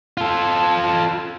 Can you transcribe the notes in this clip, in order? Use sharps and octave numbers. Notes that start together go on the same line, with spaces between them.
F4 A4